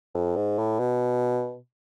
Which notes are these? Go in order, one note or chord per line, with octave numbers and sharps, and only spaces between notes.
F2
G#2
A2
B2